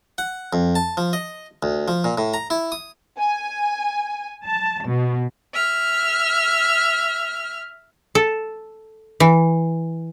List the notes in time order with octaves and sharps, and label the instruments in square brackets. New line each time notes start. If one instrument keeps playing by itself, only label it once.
[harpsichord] F#5
F2
A5
F3
D#5
D2
F3
A#2
A2
A#5
E4
D#6
[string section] G#5
A5
B2
[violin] E5 F6
[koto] A4
E3